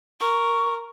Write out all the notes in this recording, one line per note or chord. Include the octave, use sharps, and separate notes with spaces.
A#4 C#6